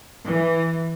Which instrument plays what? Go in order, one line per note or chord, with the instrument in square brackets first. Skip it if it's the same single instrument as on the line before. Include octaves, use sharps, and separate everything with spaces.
[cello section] E3